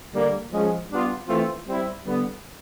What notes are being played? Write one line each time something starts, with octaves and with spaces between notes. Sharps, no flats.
D3 G3 A#3
F3 G#3 C#4
G3 B3 D4 F4
E3 A3 C4 F4
G3 C4 E4
D3 G3 B3